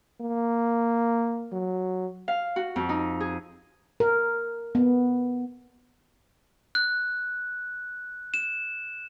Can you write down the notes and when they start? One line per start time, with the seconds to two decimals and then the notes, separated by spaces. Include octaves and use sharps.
0.21 A#3
1.53 F#3
2.28 F5
2.56 F#4
2.76 F2
2.89 D#4
3.20 G#4
4.00 A#4
4.75 B3
6.75 F#6
8.34 E7